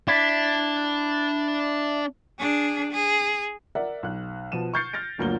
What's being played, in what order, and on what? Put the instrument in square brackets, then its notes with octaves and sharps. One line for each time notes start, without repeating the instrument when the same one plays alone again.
[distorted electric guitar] D4 [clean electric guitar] E4
[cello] D4 G#4
G#4
[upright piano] A#4 D5 E5 F#5
B1 F#6
B2 F3 A5 D#7 E7
C#6 F6 G6 A6 C7 C#7
F6 A6 A#6 D7
G1 D2 F#3 A#3 F4 G7